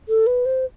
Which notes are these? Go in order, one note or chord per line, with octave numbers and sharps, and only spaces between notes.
A4
B4
C5